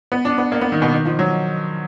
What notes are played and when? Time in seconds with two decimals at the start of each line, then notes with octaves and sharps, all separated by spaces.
0.12 B3
0.25 D4
0.38 B3
0.52 A#3
0.61 B3
0.72 D#3
0.82 B2
0.92 D#3
1.05 F3
1.19 F#3